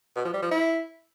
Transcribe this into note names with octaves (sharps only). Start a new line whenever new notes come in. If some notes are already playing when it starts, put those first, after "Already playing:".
B2
F3
G3
F3
E4